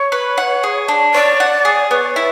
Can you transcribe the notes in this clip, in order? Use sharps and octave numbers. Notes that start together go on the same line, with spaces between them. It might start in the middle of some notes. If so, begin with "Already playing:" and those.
Already playing: C#5
B4
F#5
G#4
D4
C#5 D5
F#5
G#4
B3 C#5 D5
E4